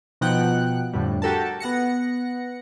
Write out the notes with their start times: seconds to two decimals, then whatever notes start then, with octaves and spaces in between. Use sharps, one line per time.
0.21 B2 F3 D#4 F#5 G5 F#6
0.93 F2 A2 D3 G3
1.22 F#4 G4 A4 A#4 A5
1.60 B3 F#5 A#6 C#7